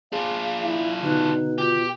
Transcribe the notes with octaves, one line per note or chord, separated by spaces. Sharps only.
D4 F4 G#4 F5
E4
B2 D3 D#4 F#6
F4 G4